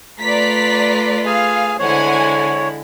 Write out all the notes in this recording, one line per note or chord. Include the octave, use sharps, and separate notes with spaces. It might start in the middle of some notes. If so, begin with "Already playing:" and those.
A3 F4 B4 D5 A#5 B6
G#4 F5 G#5
D3 G#3 E4 C5 C#5 F#5 G#5